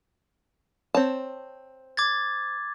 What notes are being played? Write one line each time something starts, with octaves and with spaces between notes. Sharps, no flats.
C4 C#5 A5
D6 G#6 A6